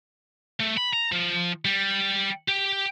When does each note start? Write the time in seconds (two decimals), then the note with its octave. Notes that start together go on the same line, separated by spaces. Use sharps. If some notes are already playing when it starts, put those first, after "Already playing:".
0.60 A3
0.78 B5
0.93 A#5
1.12 F3
1.65 G3
2.49 G4